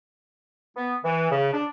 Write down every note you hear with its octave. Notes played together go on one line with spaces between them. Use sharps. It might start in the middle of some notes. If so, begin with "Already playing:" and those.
B3
E3
C#3
D4